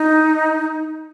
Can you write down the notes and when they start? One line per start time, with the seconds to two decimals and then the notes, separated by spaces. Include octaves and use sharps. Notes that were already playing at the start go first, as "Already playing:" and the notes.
Already playing: D#4